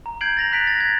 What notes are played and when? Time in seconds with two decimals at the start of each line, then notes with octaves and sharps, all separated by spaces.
0.06 A#5
0.21 G6 G#6 C7 D7 F#7
0.37 A6 A#6 F7
0.51 A#5 F#6 B6 D7 F7
0.67 A6 A#6
0.80 G#6